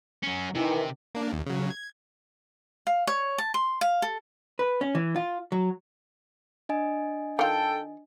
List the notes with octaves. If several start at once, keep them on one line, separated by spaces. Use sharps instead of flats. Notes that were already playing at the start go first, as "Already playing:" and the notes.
F#3 C#4
C3 D#3 E3
A#3 D4
D#2
C#3 F#3
G#6
F5
C#5
A5
C6
F5
A4
B4
C#4
E3
F4
F#3
D4 D#5 G#5
D#3 F4 A4 G5